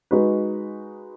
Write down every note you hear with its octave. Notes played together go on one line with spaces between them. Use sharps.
G#3 D#4 F#4 B4